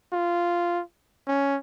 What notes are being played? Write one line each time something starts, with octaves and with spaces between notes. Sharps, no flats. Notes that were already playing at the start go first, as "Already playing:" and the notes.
F4
C#4